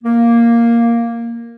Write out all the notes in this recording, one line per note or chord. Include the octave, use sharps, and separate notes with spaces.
A#3